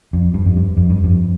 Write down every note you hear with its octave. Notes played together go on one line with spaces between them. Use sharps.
F2
G2
F2
G2
F2
G2
F2